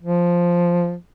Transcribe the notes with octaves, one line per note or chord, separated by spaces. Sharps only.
F3